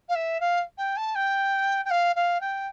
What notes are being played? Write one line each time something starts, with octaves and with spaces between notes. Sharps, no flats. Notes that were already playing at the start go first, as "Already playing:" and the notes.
F5
E5
F5
G5
A5
G5
G5
F5
F5
G5